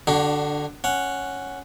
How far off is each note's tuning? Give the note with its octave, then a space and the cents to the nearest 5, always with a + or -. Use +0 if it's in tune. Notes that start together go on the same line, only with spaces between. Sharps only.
D3 +0 D4 +25 F#4 +40
C#4 +0 F#5 +0